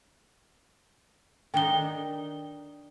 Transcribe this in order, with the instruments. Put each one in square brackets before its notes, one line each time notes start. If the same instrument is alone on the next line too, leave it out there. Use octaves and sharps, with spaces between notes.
[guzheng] D#3 D4 D#4 [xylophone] G5 G7